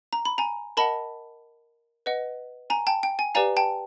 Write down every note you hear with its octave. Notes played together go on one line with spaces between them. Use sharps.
A#5
B5
G#5 A#5
A#4 D#5 F#5 A5 B5
B4 D#5 F#5
G#5 A#5
G5 A5
G5
G#5
G4 B4 D5 F5 G#5 A#5
G5 A5